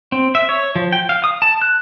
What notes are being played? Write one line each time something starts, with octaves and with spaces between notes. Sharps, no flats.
C4
E5
C#5
F3
G5
F5
D#6
A5
F#6